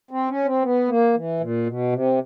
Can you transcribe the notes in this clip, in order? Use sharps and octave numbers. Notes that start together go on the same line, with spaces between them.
C4
C#4
C4
B3
A#3
E3
A#2
B2
C3